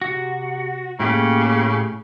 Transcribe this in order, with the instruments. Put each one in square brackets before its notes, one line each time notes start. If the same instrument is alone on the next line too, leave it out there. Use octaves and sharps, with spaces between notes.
[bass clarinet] C3 [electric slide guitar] F#4
[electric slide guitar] A2 G4 [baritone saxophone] C#3 [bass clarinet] A#3